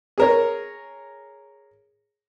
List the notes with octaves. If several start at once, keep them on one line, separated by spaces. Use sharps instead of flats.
G#4 A#4 C#5